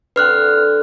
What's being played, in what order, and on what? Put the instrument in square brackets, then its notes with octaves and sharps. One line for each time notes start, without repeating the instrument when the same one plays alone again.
[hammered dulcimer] D3 C4 [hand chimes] B4 F6 F#6